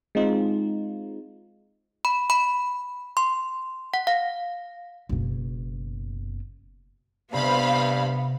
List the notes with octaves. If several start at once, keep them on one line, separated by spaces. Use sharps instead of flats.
G#3 C4 D#4 F4
B5
B5
C6
F#5
F5
F#1 B2
G2 C3 B3 C5 F5 B5